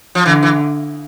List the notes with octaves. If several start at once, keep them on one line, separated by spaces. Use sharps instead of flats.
F3
D3 E3
E3